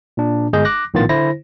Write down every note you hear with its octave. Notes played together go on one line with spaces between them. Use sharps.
A#2 D4
G1 G#3 G#4 D#5 G6
D6 F#6 A#6
A#1 A2 D#3 B3 F4 A6
D3 E4 C5 A#6